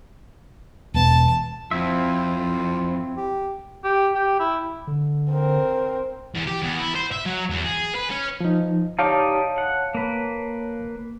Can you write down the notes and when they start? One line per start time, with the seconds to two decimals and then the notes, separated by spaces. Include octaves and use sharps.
0.94 E1 B3 A5
1.71 F2 C4 E4 F4 E5
3.17 G4
3.84 G4
4.15 G4
4.40 E4
4.87 D3
5.30 C4 A#4
6.35 E2
6.47 G4
6.62 E2
6.79 E4
6.95 C5
7.13 E5
7.26 F#3
7.50 E2
7.64 G#4
7.95 B4
8.10 C#4
8.40 F3 D#4
8.99 D#4 G4 C#5 D5 F5 A5
9.58 F#5
9.95 A#3 B4